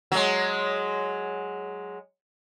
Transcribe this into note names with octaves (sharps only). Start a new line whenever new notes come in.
F#3 G#3